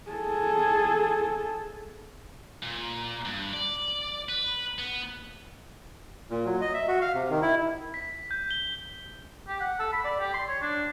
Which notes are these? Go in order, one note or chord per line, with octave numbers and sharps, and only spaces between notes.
G#4 A4
A#2
G2
D5
B4
B3
A#2
F#3
D#5
E5
F#4
F5
C3
D#3
E4
B6
G6
G7
G4
F#5
A4
B5
D5
G4
C6
C#5
D4